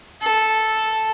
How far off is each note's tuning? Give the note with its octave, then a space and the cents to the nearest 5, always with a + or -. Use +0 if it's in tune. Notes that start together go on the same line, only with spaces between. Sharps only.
A4 -5